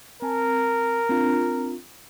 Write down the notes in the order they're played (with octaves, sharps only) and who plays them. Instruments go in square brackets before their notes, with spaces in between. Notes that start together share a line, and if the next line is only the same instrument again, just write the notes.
[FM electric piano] C4 G#5 A5 [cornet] A#4
[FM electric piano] C4 D4 F4